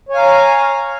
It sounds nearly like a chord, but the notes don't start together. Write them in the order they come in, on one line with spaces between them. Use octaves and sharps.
C#5 G#5 F5 A#5